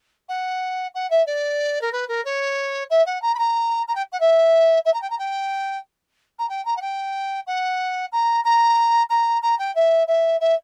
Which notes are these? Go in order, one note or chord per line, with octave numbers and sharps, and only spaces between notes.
F#5
F#5
E5
D5
A#4
B4
A#4
C#5
E5
F#5
A#5
B5
A#5
A#5
G5
F#5
E5
E5
A#5
G5
A#5
G5
A#5
G5
A#5
F#5
G5
F#5
A#5
A#5
A#5
A#5
G5
E5
E5
E5